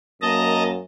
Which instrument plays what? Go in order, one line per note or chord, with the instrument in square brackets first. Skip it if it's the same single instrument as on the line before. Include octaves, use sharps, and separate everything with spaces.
[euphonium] F#2 [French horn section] A#3 [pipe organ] D#5 A5 A#5